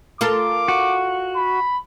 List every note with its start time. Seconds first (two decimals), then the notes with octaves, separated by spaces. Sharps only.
0.21 F4 A4 A#4 D6
0.68 F#4
1.36 B5